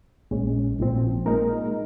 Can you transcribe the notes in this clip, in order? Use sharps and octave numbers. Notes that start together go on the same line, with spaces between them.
A#1 A#2 G#3 C#4
A#1 A#2 F3 C4
A#2 G#3 D#4 A#4